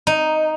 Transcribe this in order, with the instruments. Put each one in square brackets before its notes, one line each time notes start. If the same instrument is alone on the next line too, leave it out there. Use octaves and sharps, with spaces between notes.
[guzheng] D#4